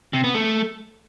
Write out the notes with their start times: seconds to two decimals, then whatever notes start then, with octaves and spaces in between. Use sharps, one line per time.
0.13 C3
0.24 B3
0.34 A3